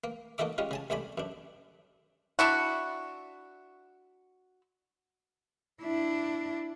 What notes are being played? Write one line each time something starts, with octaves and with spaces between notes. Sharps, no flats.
A#3
A#3 D#4 F#4 A4 E5 D6
G3 G#3 C#4 F4
C#3 G#5 A5
C2 A3 D5 G#5 B5
F#2 D4
D4 E4 F#4
D4 E4